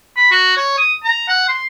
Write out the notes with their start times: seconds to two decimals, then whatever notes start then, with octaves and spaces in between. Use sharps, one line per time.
0.16 B5
0.31 F#4
0.57 C#5
0.78 D#6
1.04 A#5
1.28 F#5
1.48 C6